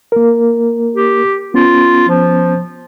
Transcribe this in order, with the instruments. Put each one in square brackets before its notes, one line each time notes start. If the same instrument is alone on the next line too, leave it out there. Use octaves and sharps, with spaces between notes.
[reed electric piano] A#3 A#4
[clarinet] G4
[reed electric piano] B3 C#4 [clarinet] F4
[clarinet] F3